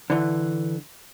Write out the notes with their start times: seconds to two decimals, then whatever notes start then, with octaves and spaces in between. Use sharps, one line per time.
0.10 D3 E3